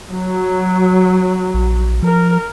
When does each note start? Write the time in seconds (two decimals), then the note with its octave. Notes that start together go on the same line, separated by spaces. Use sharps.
0.10 F#3
1.54 A#1
2.02 F3 A#4